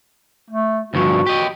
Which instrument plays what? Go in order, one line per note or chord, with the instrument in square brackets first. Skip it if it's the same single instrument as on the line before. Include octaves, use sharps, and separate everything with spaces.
[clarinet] A3
[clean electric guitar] D2 G2 F3 [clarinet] F#4
[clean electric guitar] G4 D#5